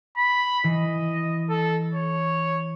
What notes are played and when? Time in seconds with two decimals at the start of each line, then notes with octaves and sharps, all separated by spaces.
0.17 B5
0.64 E3 D#5
1.50 A4
1.94 C#5